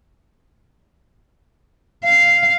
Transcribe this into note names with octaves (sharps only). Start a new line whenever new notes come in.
F5